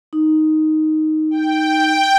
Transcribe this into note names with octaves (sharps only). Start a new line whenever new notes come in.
D#4
G5